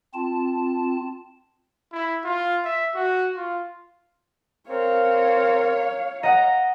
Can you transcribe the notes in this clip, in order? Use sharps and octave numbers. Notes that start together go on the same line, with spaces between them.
C4 F4 A5
E4
F4
E5
F#4
F4
C4 A#4 C#5 F5
D#5 F#5 A#5